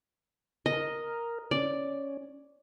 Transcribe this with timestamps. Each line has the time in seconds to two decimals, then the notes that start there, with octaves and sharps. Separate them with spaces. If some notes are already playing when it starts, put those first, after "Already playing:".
0.66 A#4 D#5
1.51 C#4 D5